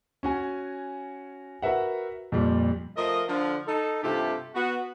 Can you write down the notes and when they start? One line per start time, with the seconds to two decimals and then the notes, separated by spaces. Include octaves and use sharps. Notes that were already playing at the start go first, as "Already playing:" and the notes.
0.23 C#4 F#4 G#5
1.62 F#4 A#4 B4 E5 F#5
2.32 F2 A#2 G3
2.97 F3 A3 F4 A#4 D#5
3.28 D3 F3
3.67 D#4 A4
4.03 G2 C3 A3 F4 G4 A4
4.55 B3 F#4